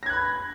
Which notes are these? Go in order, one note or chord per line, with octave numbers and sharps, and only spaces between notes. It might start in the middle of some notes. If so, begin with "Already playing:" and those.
B5 F#6 G#6 A#6